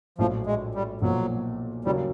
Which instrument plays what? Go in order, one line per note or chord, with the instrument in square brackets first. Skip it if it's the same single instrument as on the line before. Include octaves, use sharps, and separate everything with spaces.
[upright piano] A#1 A2 F#3 [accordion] F3
[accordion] G#3
G3
[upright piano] B1 A#2 F3 [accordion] F#3
[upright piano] D#2 C#3 F#3 A#3 [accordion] G3